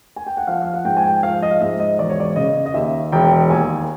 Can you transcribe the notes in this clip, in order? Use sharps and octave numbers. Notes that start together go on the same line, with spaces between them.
G#5
G5
F#5
F3 F5
F5
F#5
G#2 G5
G#5
G5
F3 F5
D#5
F5
G#2 E5
D#5
E1 D5
C#5
D5
C#3 D#5
D#5
D#2 E5
E1 G5
D#2 G#5